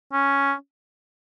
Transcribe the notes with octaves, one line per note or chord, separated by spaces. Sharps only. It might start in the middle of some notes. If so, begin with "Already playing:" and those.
C#4